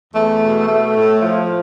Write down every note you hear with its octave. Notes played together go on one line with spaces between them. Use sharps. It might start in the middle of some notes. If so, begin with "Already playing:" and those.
E2 A3
B2
A3
A2
F3